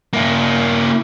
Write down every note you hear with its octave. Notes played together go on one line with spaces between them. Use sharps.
A#3 E4